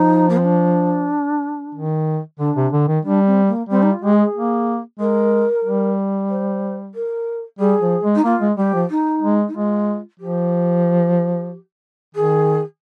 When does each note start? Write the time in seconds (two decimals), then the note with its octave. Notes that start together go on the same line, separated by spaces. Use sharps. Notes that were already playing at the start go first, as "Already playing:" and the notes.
Already playing: F3 D#4
0.29 A#3
0.37 C4
0.44 D4
1.74 D#3
2.39 D3 D4
2.56 C3
2.72 D3
2.88 D#3
3.04 G3 D4
3.26 C4
3.47 A#3
3.69 G3 C4
3.82 D#4
3.91 F4
4.01 G#3 G4
4.13 G#4
4.34 A#3
4.99 G#3 A#4
5.64 G3
6.30 C5
6.94 A#4
7.59 G3 G#4
7.81 F3
8.03 G#3
8.15 D#4
8.24 A#3 F4
8.41 G#3
8.57 G3 G4
8.73 F3
8.90 D#4
9.22 G#3
9.48 D#4
9.54 G#3 F4
10.19 F3 G4
12.15 D#3 G#4